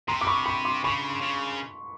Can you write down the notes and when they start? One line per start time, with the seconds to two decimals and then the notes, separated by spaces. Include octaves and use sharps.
0.08 C3 A#5 C6
0.21 D6
0.27 B5 C#6
0.46 B5 C#6
0.65 C6 D6
0.84 C#3 B5 C#6
1.22 C#3